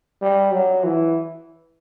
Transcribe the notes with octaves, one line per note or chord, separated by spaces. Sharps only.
G3
F#3
E3